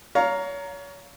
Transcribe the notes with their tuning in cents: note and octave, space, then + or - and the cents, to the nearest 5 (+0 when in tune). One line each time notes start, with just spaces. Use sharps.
C#5 +30 F5 +10 A#5 +0